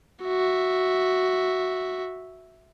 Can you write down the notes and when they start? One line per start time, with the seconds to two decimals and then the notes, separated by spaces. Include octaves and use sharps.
0.23 F#4 E5